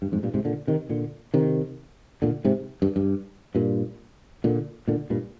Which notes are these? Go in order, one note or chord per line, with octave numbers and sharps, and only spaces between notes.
G2
F2 G#2
G2 A#2
G#2 C3
A#2 D3
C3 D#3
A#2 D3
C3 D#3
A#2 D3
G#2 C3
G2
G2
G2 A#2
A#2 D3
A#2 D3
G2 A#2